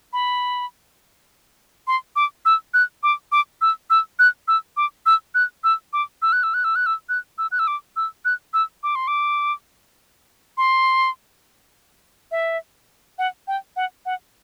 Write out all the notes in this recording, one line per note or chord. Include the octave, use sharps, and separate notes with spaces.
B5
C6
D6
E6
F#6
D6
D6
E6
E6
F#6
E6
D6
E6
F#6
E6
D6
E6
F#6
E6
F#6
E6
F#6
E6
F#6
E6
F#6
E6
D6
E6
F#6
E6
D6
C6
D6
C6
E5
F#5
G5
F#5
F#5